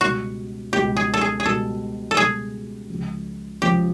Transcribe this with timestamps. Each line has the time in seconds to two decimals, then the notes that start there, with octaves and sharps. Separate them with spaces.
0.01 C#2 B2 G3 F#4
0.73 C#2 B2 G3 G4
0.97 G#4
1.14 A4
1.21 G#4
1.40 G#4
1.45 C#2 B2 G3 A4
2.11 A4
2.17 C#2 B2 G3 G#4
2.90 C#2 C#3 F3
3.62 C#2 C#3 F3 G4